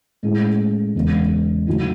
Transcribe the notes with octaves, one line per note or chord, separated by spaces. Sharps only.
A2 G#3 C#4 E4 G#4
E2 C#3 G#3 B3
C#3 F#3 A3 D#4 F#4